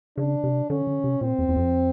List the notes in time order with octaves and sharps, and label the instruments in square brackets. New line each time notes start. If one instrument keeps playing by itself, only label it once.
[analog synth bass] C#3 [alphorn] D4
[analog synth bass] C3
[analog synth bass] D3 [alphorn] C#4
[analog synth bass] D3
C3
[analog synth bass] A#2 [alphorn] C4
[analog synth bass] E2
E2
F2